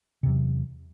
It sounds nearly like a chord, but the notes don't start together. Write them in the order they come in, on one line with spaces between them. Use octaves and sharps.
C3 E2 F#3